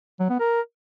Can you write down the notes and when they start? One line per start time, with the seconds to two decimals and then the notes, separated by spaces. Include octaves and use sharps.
0.20 F#3
0.30 B3
0.40 A#4